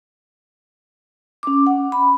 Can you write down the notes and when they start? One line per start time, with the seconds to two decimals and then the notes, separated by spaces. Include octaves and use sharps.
1.43 C#4 D6
1.67 F#5
1.92 B5